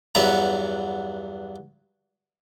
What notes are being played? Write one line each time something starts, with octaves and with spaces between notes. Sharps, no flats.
E2 G2 F#3 B3 E5 A#5